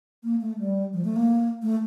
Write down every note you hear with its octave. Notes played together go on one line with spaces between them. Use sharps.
A#3
A3
G3
F3
A3
A#3
A3